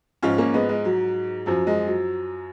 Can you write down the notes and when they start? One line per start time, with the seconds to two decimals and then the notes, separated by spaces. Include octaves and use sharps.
0.23 G#2 F3 C#4 F4
0.38 A#3 C#4
0.54 G#3 B3
0.69 G#3
0.85 F#3
1.46 F#2 F3 F#3
1.67 G#3
1.87 F#3